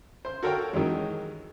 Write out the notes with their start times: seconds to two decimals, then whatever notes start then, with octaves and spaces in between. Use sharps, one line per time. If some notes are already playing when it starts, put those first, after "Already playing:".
0.25 C5 C6
0.43 F#4 A4 A#4 C#5 F5 G5
0.73 D#3 E3 F#3 G#3